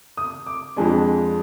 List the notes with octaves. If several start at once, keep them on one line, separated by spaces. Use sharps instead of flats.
D#6
D6
F2 F3 G#3 D4 G#5